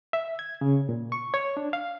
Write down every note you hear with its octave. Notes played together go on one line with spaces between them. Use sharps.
E5
G#6
C#3
A#2
C#6
C#5
D4
F5